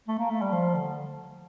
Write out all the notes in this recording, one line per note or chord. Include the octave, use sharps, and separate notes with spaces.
A3
A#3
A3
G3
F3
D3